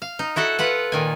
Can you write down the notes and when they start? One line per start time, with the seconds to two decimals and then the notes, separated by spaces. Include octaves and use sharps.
0.02 F5
0.19 D#4
0.36 E4 F#4 A4 F#5
0.59 F4 B4 F#5
0.92 A#2 D#3 G#5